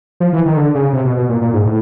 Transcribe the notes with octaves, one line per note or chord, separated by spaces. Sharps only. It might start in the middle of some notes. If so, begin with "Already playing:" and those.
F3
E3
D#3
D3
C#3
C3
B2
B2
A#2
A#2
G#2
A2